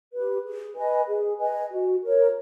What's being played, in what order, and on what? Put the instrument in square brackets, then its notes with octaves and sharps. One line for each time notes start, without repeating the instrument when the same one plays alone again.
[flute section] G4 B4
G#4
B4 D#5 G#5
G#4
B4 D#5 G#5
F#4
A#4 C#5